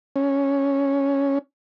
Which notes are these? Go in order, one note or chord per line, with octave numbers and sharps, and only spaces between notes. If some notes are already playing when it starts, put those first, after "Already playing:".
C#4